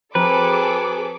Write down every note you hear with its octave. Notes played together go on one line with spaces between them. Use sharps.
F3 C4 F#4 G#4 A4 B4 A#5 D6